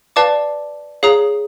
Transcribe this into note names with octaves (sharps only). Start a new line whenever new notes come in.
B4 D5 F5 A5 D6
G#4 C#5 F5 A#5 D#6